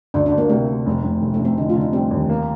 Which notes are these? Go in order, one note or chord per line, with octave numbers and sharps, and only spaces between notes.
D2 D4
D4
D2
A#3
C3 A3
C3
F1
F1
F1
A3
F1
C4
D3 D#4
F4
D3
D#4
G3 C4
D#2
A#3